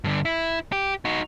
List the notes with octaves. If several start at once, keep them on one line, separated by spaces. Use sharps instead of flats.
G2 D3
E4
G4
D#4 F#4